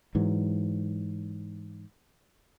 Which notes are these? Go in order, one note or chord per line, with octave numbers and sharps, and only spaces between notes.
G#2 E3 F#3